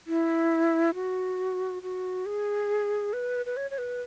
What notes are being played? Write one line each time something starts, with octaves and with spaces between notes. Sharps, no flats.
E4
F#4
F#4
G#4
B4
B4
C#5
C#5
B4